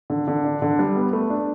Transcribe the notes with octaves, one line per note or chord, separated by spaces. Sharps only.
D3
D3
D4
D3
G3
B3
A3
D4